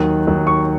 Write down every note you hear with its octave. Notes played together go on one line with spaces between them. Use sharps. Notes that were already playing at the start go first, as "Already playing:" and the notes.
Already playing: D#2 D#3 F#3 F#6
D#2 D#3 F#3
C#6